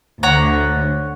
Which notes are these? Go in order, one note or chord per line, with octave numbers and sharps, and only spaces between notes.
D2 D3 C#5 F#5 A#5